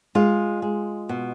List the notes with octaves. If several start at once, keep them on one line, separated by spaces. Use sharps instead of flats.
G#3 F4
G#3
B2